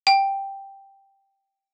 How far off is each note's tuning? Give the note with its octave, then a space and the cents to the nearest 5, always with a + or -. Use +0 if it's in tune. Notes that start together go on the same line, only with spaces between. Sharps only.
G5 +0